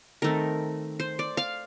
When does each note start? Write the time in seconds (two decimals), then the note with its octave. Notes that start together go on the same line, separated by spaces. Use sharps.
0.22 D#3 A3 C4 A#4
1.00 C5
1.19 D5
1.37 F5